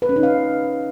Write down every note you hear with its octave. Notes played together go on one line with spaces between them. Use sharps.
B4
C#4
D#4
F5